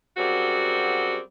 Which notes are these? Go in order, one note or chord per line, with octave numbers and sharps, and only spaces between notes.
F#2 G3 C4 F#4 G#4